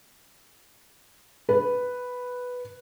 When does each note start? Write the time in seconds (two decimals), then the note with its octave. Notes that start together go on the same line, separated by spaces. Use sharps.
1.49 B4